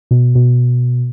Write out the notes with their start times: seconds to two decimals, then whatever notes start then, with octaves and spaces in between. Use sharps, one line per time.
0.11 B2
0.35 B2